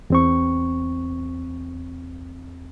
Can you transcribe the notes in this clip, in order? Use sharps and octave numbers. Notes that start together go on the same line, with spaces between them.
E2 C4 C#6